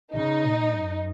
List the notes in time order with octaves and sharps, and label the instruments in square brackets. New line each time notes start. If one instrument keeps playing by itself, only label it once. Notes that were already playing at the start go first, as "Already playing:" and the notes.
[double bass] C#3 [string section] D#4
[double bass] A#2
F#2